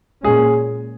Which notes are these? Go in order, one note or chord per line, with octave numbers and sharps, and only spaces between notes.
A#2 G#3 C#4 G#4